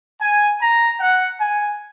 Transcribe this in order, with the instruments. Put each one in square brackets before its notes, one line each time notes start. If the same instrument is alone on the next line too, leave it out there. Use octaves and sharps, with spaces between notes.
[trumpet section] G#5
A#5
F#5
G#5